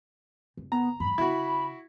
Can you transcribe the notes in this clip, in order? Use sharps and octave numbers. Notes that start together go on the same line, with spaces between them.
F#1
B3 A#5
E2 G2 B5
C#3 E4 F#4